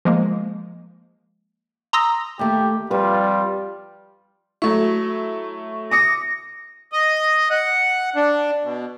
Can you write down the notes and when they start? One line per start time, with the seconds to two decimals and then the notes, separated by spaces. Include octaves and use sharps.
0.05 F3 G#3 A#3
1.93 A#5 C6 D#6 E6 A#6
2.39 D#2 A3 G4
2.91 F2 G3 F4 B4
4.62 F#3 A3 E4 C#6
5.91 D6 D#6 A#6 C#7
6.92 D#5
7.50 F#5
8.16 D4
8.64 B2